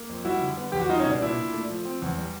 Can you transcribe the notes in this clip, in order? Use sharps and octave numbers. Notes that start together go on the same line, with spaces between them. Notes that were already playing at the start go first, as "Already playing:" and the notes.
Already playing: A#3
F2
G3 E4 F#4
D3
B3
E2 G4
F#4
G3 D#4 F4
C#4 D#4
B2 D4
A#2 D4 E4
A#2
A3
F3
C4
E2
G3